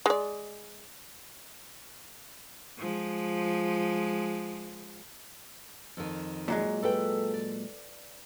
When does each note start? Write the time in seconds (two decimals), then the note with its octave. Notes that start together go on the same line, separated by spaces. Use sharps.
0.06 G#3 D5
2.78 F3 G#3
5.97 F2 D#3
6.48 A#2 F#3 G#3
6.83 A4 B4 G5
7.34 D5